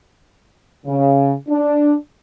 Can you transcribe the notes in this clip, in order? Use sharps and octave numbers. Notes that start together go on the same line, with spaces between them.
C#3
D4